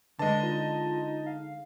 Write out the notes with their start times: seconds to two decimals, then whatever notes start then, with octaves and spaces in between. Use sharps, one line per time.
0.19 D3 G#3 B4 D#5 A5
0.43 D#4 F4
1.26 F5